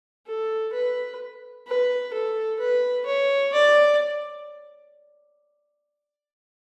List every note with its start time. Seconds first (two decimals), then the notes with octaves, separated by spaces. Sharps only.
0.28 A4
0.73 B4
1.67 B4
2.13 A4
2.60 B4
3.06 C#5
3.53 D5